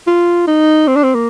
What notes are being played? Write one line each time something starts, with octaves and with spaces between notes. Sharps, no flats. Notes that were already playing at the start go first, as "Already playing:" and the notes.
F4
D#4
C4
D4
C4
A#3